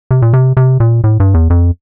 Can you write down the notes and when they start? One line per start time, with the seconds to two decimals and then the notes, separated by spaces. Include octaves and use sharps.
0.11 C3
0.22 A#2
0.33 C3
0.57 C3
0.80 A#2
1.04 A2
1.20 G2
1.34 E2
1.50 F2